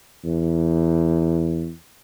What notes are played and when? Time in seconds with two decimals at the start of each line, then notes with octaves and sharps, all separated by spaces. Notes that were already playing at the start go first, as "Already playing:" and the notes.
0.25 E2